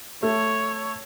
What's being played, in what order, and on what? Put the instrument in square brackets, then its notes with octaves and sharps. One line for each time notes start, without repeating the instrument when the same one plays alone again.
[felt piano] A3 [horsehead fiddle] C#5